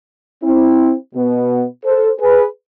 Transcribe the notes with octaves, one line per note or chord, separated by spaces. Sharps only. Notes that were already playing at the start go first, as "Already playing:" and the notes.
C4 E4
B2 B3
A4 C5
G#4 B4